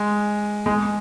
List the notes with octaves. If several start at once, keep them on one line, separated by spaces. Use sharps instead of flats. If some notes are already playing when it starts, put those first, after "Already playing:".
Already playing: G#3
G#3